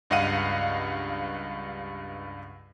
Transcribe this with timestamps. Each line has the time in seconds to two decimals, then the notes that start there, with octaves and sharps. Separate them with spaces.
0.10 C#2 G2 D#5 F5 F#5 D#7